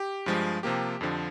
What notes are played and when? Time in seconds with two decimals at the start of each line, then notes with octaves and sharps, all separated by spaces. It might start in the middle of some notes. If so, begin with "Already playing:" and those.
Already playing: G4
0.26 G2 F3 G#3
0.63 C3 F3 A#3 G4
1.01 F2 D3 F3